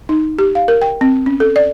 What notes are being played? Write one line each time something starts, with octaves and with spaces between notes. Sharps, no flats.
D#4
G4
F5
A#4
G5
C4
C#4
A4
D5